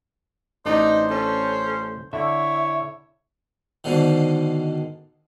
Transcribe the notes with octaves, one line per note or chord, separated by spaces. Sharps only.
A1 D4 D#4 C5 D5
C#4 A4
D3 E4 C#5 E5
G#2 B2 D3 D#3